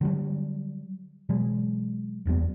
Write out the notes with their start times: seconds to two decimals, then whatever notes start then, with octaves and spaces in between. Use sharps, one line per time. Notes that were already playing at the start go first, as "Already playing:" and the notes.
0.01 D3 F#3 G3
1.29 B2 E3 F#3 G#3
2.26 F#1 E2 G3 B3